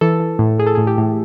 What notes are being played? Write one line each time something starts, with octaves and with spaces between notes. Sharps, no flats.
E3 A4
E3
A2
A2 G#4
A4
A2 G#4
G4
A2